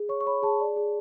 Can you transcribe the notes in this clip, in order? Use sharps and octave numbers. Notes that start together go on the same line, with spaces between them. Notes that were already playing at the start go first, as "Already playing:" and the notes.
Already playing: G#4
C#5 C#6
C#6
C#5 B5
G#4 A5
D5
G#4